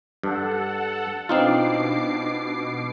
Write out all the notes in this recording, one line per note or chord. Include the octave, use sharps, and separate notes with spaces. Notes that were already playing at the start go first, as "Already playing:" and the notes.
G2 A4 F#5
B2 C4 D4 D#4 F4 D6 C7